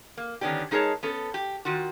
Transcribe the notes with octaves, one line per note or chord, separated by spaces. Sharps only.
A#3
D3 D#3 B3 C#4 D4 G4
G#3 D#4 G#4 A#4 C#5 A5
B3 C#4 A4
G4
D#3 F4 F#4